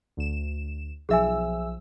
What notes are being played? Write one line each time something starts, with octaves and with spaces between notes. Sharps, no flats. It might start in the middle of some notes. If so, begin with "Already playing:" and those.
D2 E7
B1 F3 G#4 E5 G#5 E6